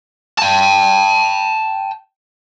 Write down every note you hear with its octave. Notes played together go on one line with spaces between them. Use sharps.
G5 A5